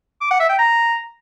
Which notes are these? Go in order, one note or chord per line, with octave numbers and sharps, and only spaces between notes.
D6
F#5
E5
G5
A#5